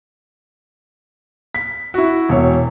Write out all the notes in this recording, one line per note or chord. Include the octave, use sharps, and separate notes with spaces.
B6
E4 F#4
E1 C#5